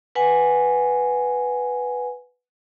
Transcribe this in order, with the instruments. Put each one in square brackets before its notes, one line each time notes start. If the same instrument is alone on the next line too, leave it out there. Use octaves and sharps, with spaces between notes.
[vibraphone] B4 F#5 G#5